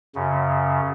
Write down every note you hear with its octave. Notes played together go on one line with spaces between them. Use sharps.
F#2 C#3